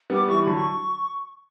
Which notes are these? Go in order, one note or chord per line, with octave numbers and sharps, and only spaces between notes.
G3 B3 D6
E3 G3 C#6
D3 F#3 B5
C#6